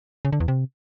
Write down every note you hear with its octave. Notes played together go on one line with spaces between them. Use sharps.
C#3
D3
E2
C3